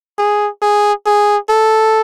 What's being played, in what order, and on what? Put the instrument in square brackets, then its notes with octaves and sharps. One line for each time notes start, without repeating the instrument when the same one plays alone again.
[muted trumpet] G#4
G#4
G#4
A4